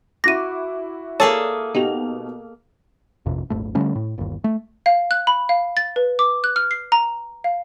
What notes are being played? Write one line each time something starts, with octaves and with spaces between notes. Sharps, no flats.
E4 F#4 D6 A#6 D#7
A#3 G#4 A4 C#5 D5 A5
B2 D#4 F#4 G4 F7
A#1 F2 C3
D#1 G#1 A3
D3 G3 A3 C#4
A2
G1 D#2
A3
F5
F#6
B5
F5
A6
B4
D6
F#6
F6
C7
A#5
F5